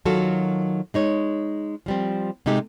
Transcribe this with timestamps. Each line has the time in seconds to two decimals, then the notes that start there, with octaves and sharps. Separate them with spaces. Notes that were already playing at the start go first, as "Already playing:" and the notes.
0.05 D#3 F#3 F4 F#4 A4
0.94 G#3 D#4 C#5
1.86 F3 G3 C4
2.46 C3 G#3 A3 D#4 G4